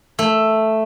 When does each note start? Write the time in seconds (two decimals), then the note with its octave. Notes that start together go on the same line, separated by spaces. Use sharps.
0.19 A3